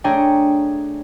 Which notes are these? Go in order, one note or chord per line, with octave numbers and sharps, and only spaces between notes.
A3 D4 G#4 C#5 G5 A#5